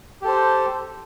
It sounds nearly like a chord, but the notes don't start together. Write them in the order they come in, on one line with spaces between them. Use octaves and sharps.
G4 A4 C5